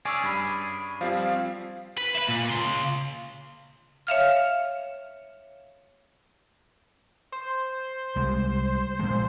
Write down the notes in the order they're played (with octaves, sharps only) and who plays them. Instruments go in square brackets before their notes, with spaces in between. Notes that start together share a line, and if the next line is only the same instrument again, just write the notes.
[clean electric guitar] C#4 G#4 D5 [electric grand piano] G#5 C#6 E6
[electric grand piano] G2 B5
[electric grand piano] F3 G3 C4 [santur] F5
[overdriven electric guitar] B4
B4 E5
A#2
C#3 C6
[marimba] C#5 E5 F5 F6
[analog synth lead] C5
[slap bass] C2 G3 G#3
A#2 F3 G#3